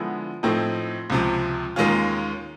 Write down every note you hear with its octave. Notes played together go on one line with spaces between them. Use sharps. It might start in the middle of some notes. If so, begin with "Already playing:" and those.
Already playing: D3 F3 G#3 B3 E4
A2 F3 A3 C4 D#4
C#2 C3 F3
D#2 D#3 G#3 C#4 F4